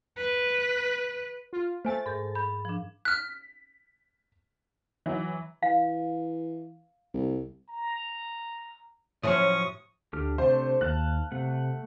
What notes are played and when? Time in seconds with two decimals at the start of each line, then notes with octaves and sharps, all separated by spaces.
0.18 B4
1.53 F4
1.85 A3 C5 G#5 A6
2.06 G#2 A#4 G6
2.35 B5 G6
2.65 F3 D4
3.05 F6 F#6 B6
5.06 E3 F#3
5.63 E3 F5
7.14 C2
7.69 A#5
9.23 A2 F3 F#3 C#4 C#6 D#6
10.13 D2 D4 G4 F6
10.38 C3 A3 D4 C5
10.81 D#2 F5 A5 F#6
11.32 C3 A3 F#5